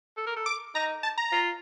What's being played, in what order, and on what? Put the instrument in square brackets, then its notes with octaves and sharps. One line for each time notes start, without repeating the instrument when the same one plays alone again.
[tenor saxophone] A4
A#4
A4
[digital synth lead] D6
[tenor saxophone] D#4 [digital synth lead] A#5
[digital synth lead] A5
A#5
[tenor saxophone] F4